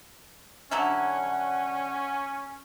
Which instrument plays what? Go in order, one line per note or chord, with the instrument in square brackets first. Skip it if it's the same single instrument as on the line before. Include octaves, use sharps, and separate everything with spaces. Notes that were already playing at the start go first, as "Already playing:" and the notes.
[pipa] D3 F#3 E4 [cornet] C#4 [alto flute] F#5